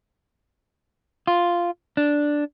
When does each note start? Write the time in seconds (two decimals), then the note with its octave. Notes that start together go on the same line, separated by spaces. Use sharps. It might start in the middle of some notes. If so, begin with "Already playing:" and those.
1.27 F4
1.97 D4